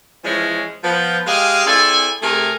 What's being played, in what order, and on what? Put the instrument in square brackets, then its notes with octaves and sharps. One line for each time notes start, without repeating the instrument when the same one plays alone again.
[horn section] E3 F3 G#3 C#4
F3 B3
G#3 G4 G#4 D#5 F5
C4 E4 G#4 A4 D5 G#5
C3 A3 G#4 A#4 G#5